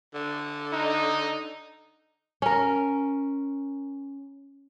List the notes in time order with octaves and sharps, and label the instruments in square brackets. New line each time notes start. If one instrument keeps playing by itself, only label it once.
[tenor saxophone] D3
[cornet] D#4
[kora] C#4 A#4